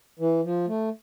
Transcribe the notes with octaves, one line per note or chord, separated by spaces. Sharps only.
E3
F3
A3